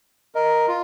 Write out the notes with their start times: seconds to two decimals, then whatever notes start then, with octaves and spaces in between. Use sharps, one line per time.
0.35 A#4 D#5
0.68 F4